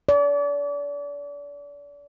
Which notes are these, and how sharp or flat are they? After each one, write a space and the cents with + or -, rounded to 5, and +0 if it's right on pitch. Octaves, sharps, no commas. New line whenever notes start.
D5 -35